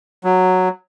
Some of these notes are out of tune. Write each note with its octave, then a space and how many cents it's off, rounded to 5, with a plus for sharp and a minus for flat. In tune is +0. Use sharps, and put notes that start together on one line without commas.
F#3 -5